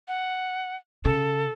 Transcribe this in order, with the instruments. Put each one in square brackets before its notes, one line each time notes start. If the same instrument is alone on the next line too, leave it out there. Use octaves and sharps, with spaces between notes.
[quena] F#5
[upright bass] C#3 [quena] A4